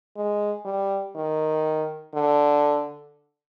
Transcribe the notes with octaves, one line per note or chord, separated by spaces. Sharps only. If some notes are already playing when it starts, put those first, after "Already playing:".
G#3
G3
D#3
D3